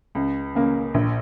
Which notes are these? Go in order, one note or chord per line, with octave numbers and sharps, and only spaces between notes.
C#2
C#3 A#3
A#1